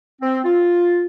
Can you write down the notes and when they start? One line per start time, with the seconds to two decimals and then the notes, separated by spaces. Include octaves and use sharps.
0.21 C4
0.44 F4